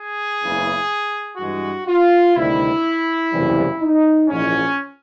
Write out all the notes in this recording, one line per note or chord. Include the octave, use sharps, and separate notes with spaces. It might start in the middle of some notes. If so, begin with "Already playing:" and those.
Already playing: G#4
F#1 E2 C#3 E3
G2 E3 G#3 F#4
F4
D2 C3 D#3 G3 E4
F#1 E2 C3 E3 G3
D#4
A#1 G#2 E3 C#4